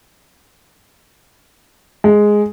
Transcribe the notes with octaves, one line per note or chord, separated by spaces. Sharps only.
G#3